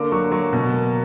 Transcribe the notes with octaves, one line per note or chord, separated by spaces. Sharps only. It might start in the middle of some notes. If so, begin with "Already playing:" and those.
Already playing: D3 A#3 D6
F#3 C#6
F#3 C#6
B2
A#3